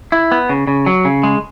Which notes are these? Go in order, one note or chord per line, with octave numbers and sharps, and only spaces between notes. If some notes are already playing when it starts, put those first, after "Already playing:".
E4
B3
C#3
C#3
F#3
C#3
G#3